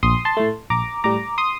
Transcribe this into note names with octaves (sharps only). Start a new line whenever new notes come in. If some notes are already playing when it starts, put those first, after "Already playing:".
A#1 C6 D#6
A5 C6
A2 A3
A#1 A#5 D6
A2 G3 A#5 D6
C6 D#6